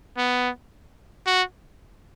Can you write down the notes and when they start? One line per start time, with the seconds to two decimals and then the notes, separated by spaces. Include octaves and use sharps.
0.18 B3
1.27 F#4